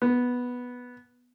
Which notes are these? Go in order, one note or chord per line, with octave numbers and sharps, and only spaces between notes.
B3